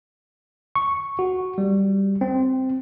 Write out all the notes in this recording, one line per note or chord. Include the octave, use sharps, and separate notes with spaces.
C#6
F#4
G3
C4